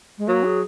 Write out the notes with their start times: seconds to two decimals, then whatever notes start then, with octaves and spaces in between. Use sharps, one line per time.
0.18 G#3
0.28 F#3 A#3
0.44 G#4